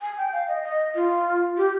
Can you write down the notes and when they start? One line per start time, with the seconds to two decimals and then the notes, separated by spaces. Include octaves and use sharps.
0.02 G#5
0.18 G5
0.33 F5
0.48 D#5
0.63 D#5
0.95 F4
1.57 G4